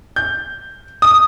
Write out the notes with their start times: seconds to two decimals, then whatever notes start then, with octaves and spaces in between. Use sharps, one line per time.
0.16 G6
1.02 D#6